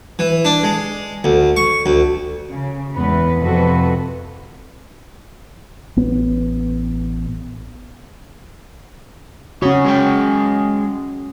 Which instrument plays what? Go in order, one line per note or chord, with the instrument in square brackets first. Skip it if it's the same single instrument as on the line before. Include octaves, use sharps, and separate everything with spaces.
[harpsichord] E3
D4
G#3
D2
C#6
D2
[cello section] C#3
E2 A2 G#3 B3 B4
F2 C3 F#4 A4 B4
[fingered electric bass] A1 B3
[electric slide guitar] C#3 C#5 [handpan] C#4 F#4
[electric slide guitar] G#3 G#4 G5